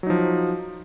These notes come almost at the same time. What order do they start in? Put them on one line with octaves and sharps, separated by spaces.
F#3 D#4 F3